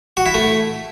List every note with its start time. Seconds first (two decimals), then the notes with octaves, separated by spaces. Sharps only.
0.17 F#4
0.26 E4
0.34 A3